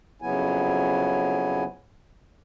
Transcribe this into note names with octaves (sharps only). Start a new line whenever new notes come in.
F2 C#3 F#3 B3 E4 G#5